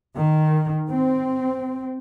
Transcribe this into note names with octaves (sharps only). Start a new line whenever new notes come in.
D#3
C4